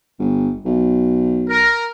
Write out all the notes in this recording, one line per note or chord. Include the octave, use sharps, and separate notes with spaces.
G1
B1
A#4